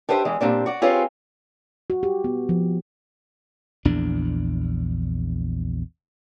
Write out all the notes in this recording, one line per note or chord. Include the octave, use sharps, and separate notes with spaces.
D4 G4 B4 C5 D#5 E5
E2 E3 G#3
A#2 G3 C4 D4
F#4 D5
C4 C#4 F4 G4 G#4 B4
F#4
G4
B3
F3
A#1 E2 D4